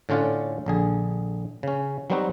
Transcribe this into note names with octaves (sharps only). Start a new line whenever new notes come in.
A2 D3 C#4 F4 D5 F#5
A#1 D3 G#4
C#3 C#4
F#3 G3 B3 C4 D#4 F#4